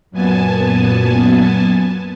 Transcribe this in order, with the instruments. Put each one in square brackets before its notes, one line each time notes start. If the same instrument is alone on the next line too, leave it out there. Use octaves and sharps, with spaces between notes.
[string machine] F#2 A#2 B3 G#5 A5